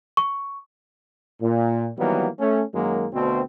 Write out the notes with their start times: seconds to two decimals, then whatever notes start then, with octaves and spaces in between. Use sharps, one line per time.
0.17 C#6
1.42 A#2
1.98 D#3 E3 F#3 G3 A#3 B3
2.39 A3 C#4
2.73 F#2 D#3 F#3 G#3 A#3
3.13 D2 B2 C4